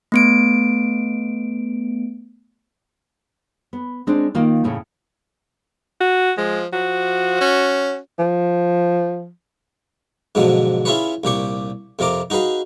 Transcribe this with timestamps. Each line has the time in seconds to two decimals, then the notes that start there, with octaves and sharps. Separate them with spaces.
0.12 A3 B3 D7
3.73 B3
4.07 G#3 C4 D4
4.35 D#3 A#3 F4 A#4
4.64 E2 A2 C#3
6.01 F#4
6.38 F3 G#3
6.73 F3 F#4
7.41 C#4
8.19 F3
10.35 G#2 B2 D3 F3 F#3
10.85 C#4 E4 F4 G#4 B4 C#5
11.24 C2 A#2 G4 C#6
11.99 F2 C3 F4 A#4 D6
12.30 D#4 F#4 G#4 B4 F5